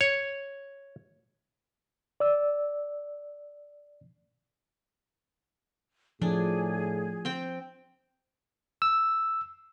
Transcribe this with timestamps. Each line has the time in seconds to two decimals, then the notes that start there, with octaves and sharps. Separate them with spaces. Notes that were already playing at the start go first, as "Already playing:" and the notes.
0.01 C#5
2.20 D5 E6
6.22 A2 F3 D4 G#4
7.25 C4 G5
8.82 E6